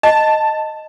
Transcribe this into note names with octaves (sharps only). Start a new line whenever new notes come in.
D#5 A5